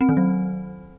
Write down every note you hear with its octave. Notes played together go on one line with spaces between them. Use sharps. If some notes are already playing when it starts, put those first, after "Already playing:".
C4
D#3
F#3